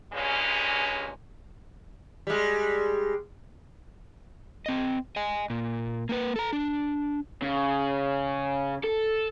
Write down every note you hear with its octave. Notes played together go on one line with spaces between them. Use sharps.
G2 A#2 C#3 G#3 C#4
G3 G#3
C4 D#5
D#5 G#5
A#2
A#3 B4
A4 A#5
D4
C#3
A4